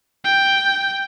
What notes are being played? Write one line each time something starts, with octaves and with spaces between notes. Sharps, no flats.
G5